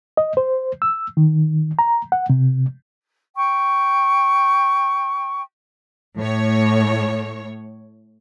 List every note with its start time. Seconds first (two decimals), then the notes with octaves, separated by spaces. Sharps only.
0.17 D#5
0.37 C5
0.82 E6
1.17 D#3
1.79 A#5
2.12 F#5
2.30 C3
3.37 G5 C#6
6.18 A2 C#5